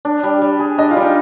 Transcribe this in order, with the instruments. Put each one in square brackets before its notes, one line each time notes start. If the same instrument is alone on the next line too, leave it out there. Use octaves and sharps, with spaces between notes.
[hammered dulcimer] D4
G3
G3
G#4
[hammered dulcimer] D4 [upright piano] D#5
[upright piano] F4
[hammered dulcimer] G3
[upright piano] D#4